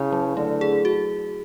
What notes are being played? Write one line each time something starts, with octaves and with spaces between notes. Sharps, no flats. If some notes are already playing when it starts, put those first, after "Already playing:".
Already playing: C#3 E4
F#3
D3 A3
G#4
F#4